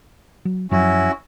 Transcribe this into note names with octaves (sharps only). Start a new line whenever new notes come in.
F#3
F#2 F3 F#3 C#4 E4 F#4